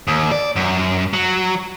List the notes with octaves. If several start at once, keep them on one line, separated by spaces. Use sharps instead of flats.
D#2
D5
F#2
F#3